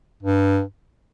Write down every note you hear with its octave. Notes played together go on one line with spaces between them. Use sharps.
G2